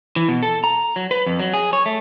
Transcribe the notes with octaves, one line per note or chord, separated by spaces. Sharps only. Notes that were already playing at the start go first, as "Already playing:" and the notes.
E3
B2
A4
A#5
F#3
B4
F2
F#3
G#4
C#5
A3